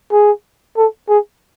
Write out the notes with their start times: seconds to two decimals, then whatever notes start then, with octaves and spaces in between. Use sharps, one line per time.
0.12 G#4
0.77 A4
1.09 G#4